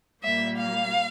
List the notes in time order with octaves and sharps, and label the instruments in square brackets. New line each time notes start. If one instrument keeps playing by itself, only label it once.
[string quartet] A#2 G3 A#3 E5
F5